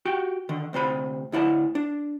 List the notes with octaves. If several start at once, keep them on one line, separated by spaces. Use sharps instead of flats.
F#4 G4 G5
D3 D#3
D2 C3 C5 B5
D2 E4 D5 F#5 A5
D4